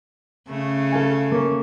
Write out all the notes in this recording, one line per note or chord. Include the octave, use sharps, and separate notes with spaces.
C#3 A3
A4 F5 G#5
A#3 C#4